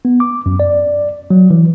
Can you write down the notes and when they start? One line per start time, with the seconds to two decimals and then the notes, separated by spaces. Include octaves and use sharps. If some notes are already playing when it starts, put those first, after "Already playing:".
0.05 B3
0.20 D6
0.46 F#2
0.60 D5
1.30 F#3
1.51 E3